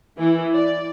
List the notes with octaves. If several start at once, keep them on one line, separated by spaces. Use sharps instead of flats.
E3
D5